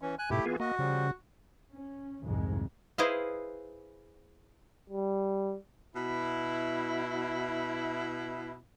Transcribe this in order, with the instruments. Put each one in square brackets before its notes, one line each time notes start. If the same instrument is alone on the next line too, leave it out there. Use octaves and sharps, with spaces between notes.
[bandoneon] E3 C#4
G#5 F#6
[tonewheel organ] G#2 B2 [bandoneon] A3 E4 G4
[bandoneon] E3 [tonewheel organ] B3 F4 G#4
[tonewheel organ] A#3 [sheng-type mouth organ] F#4 [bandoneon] D#5
[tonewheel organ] C#3 [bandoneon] F3 G3
[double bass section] C#4
C2 F2 G#2 D#3 G#3
[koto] E4 G#4 B4 C5 D#5 F5
[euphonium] G3
[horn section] B2 E4